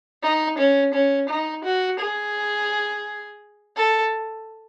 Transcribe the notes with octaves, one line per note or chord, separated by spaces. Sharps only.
D#4
C#4
C#4
D#4
F#4
G#4
A4